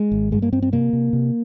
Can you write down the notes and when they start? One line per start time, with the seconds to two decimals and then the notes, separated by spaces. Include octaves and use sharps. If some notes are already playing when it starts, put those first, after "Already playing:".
Already playing: G#3
0.12 G#1
0.31 G2 G#3
0.42 A#3
0.52 G2 C4
0.62 C4
0.72 C3 A#3
0.93 C3
1.13 C3